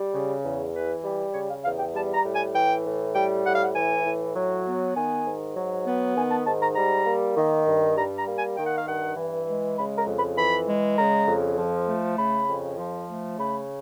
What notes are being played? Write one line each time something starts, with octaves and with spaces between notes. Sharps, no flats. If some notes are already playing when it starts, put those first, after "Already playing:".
Already playing: G3
C#3
E2
E3 B4
G3
C#3 C#5
F5
E2 F5
G5
G3 A5
A#5
A2
G#5
E3 G5
A2
G3 G5
A2 F#5
F5
F#5
E3 G#5
A2
F#3
B3
D#3 G#5
G#2
F#3
B3
D#3 G#5
A5
G#2 A5
A#5
G3 A#5
A#3
D#3
G2
G3 A#5
A#5
A#3
G#5
D#3 G5
F#5
F5
G2 F#5
E3
G#3
C#3 B5
A#5
F2
B5
E3 B5
G#3
C#3 A#5
F2
F3
A3
C#3 B5
F2
F3
A3
C#3 B5